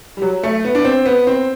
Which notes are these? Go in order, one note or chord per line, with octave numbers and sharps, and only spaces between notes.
G3
F#3
A3
B3
D4
C4
B3
C4